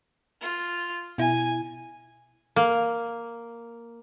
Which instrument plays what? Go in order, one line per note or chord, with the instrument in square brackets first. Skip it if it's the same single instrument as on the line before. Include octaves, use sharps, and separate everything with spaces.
[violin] F4
[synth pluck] B2 E4 [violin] G#5
[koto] A#3